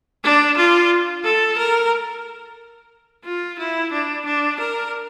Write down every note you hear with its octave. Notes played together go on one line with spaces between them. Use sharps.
D4
F4
A4
A#4
F4
E4
D4
D4
A#4